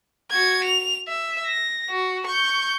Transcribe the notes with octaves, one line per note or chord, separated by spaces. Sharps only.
F#4 G#6
F7
E5
A#6
F#4
C#6 G6